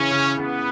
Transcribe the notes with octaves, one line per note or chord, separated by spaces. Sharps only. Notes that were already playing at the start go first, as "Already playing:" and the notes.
Already playing: C#3 E3 C#4
C#3
C#3 B3